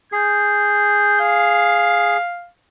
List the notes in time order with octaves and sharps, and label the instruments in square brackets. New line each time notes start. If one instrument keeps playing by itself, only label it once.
[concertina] G#4 [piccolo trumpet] G6
[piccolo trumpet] F5